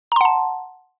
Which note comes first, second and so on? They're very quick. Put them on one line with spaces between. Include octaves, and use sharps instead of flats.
A#5 C6 F#5 A5